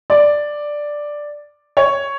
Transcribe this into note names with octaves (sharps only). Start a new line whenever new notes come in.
D5
C#5